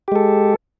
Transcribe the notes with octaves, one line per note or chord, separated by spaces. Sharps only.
G#3 G4 A4